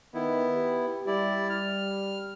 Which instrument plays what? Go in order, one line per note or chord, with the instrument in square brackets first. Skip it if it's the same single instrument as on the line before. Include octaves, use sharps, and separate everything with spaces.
[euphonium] D#3 [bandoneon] B3 E4
[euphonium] G4
[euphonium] G3 [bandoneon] E4 D5
[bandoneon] F6